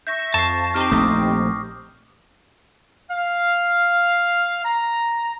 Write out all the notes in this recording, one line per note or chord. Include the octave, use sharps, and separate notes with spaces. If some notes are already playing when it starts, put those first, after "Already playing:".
E5 C#6 G6 A#6
F2 A5 C#6 C7 E7
C4 D#4 G4 D6 F6
A#1 A3 D#6
F5
A#5